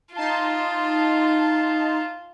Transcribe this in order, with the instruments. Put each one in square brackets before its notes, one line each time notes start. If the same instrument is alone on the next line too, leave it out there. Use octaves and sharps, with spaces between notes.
[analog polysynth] D#4 A5 C6 [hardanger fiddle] F4